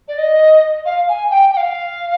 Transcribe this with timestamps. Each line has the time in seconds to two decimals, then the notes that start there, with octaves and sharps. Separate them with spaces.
0.08 D5
0.18 D#5
0.85 F5
1.09 G#5
1.30 G5
1.53 G5
1.57 F5